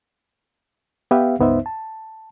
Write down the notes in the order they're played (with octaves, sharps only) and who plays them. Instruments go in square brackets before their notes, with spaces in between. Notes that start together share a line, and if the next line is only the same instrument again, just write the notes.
[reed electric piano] B3 G4 B4 E5 F5 G5
C#2 G2 B3 D#4 C5 E5
A5